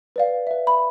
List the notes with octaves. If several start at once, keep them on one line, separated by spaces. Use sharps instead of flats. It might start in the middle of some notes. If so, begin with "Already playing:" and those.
B4 D5 F5
B4 E5
B5